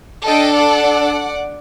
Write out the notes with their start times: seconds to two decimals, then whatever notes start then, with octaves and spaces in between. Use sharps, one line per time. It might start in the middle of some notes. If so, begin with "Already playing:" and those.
0.25 D4 A4 D#5 G5
0.54 D5 F#5